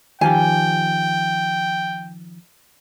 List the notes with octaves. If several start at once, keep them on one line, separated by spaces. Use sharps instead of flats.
D#3 F3 G4 G5 G#5